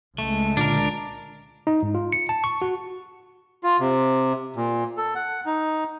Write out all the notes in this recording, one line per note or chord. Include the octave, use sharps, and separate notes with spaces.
C#2 G#3 A3
A#2 D3 D4 F4 A#4
D#4
G#2
F4
C#7
A5
C#6
F#4
F4
C3
A#2
A4
F#5
D#4